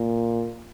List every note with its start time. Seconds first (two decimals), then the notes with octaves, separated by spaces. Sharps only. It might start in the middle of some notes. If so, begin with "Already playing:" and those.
Already playing: A#2